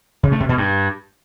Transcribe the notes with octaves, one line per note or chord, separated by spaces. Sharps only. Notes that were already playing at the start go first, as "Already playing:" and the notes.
C#3
A3
C3
B2
G2